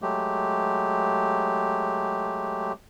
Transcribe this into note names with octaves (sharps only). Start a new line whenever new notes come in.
F#3 G#3 A3 G4